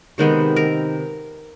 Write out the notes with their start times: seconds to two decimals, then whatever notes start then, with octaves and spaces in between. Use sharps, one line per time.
0.18 C3 D#3 G#3 B3
0.56 A#4